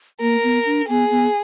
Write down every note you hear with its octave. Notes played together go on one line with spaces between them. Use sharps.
A#3 A#4
B3
D4
B3 G#4
B3